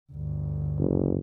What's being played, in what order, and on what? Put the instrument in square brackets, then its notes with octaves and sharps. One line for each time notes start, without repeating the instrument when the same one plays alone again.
[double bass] G1 D2
[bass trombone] F#1